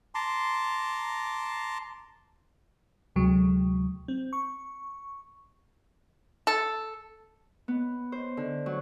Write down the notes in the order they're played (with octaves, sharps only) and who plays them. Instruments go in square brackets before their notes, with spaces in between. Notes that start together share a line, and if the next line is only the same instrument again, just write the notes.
[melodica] A5 A#5 C6 D6
[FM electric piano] D2 C3 F#3 G#3
C4
C#6
[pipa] A4
[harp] B3
C5
D3
F#3